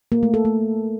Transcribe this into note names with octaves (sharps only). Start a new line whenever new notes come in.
A#3
A3
A4
A3